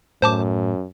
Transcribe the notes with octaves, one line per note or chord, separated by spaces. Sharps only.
F#2 A2 C5 A5 D6